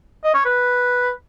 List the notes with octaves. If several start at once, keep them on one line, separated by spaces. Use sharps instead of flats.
D#5
C#5
B4